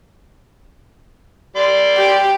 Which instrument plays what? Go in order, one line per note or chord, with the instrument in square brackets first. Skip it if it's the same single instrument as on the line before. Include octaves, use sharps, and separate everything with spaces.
[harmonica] G3 D5 C6
[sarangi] G4